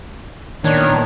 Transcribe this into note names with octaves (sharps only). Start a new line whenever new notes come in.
A#2 D#3 B3 D4 C#5